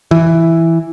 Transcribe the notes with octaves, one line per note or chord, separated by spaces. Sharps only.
E3